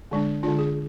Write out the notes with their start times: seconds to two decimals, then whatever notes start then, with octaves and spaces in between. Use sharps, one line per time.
0.11 D3 G#3 D4
0.43 D3 G#3 D4 F4
0.59 G#4